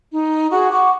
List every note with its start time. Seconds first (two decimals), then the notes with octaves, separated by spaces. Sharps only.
0.13 D#4
0.51 F#4 G#4 C#6
0.71 F#5 C#6 D6